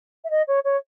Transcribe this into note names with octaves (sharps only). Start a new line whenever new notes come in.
E5
D#5
C#5
C#5